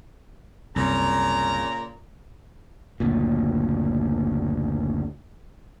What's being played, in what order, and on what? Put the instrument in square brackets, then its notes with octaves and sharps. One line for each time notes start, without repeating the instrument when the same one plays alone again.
[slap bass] C2 F#2 [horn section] A#2 C#3 A#5
[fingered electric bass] F#1 D2 A#2